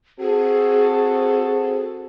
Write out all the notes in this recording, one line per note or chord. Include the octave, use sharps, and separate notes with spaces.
C4 F#4 G#4 A4